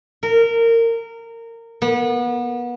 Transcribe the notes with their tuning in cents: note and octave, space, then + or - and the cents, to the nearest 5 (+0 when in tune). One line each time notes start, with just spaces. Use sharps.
A#4 -20
B3 -30